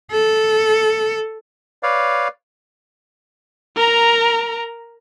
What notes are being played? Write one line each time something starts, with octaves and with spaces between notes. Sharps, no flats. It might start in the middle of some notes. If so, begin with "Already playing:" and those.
A4
B4 C#5 D5 F5
A#4 A#5